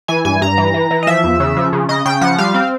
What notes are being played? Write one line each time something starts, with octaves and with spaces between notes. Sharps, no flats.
E3 G#5
G2 G#5
G2 A#5
E3
E3
E3
D#5
F3 E5
E2
C#3
F3
C#3
C#3 D#5
C#3 G5
F3 F#5
G3 F5
C4